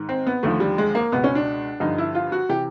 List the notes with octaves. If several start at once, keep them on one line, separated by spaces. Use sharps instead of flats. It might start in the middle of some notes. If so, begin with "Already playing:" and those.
Already playing: G#2 D#3
C4
B3
D#2 D3 F3 A3
G3
G#3
A#3
C#2 B2 B3
C#4
D4
G2 D3 F3 D#4
E4
F4
F#4
C3 E3 G4